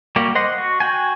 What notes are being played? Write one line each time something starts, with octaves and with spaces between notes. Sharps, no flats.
G3 A#3 F#4 G4
C5 D#5 F#5 C6
F#4
F#4 G5 G#5